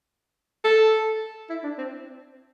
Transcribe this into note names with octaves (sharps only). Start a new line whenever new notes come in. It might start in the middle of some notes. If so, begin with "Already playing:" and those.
A4
E4
D4
C4